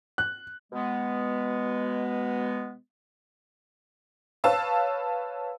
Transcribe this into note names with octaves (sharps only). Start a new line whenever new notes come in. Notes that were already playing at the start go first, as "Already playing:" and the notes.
F#6
B2 G#3 B3
B4 C#5 F5 A5 E6